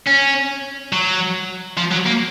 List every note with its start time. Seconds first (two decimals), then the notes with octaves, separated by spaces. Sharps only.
0.07 C#4
0.93 F#3
1.78 F3
1.92 F#3
2.06 A#3